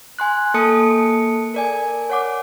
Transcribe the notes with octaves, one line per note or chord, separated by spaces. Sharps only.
G#5 C6 F#6
A#3 A4 A5 D#6 C#7
A#4 D5 G#5
C#5 F#5 D6